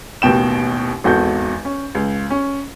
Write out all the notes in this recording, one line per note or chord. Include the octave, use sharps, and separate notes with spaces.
A1 D#2 B2 G5 E7
G#1 E2 F#4 A4 G6
C#4
C#2
C#4